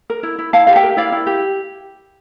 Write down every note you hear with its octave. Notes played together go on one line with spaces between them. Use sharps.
A#4
E4
E4
E4 F5 A5
G4 F5
E5 G5
A#4
E4 D5 F5
E4
G4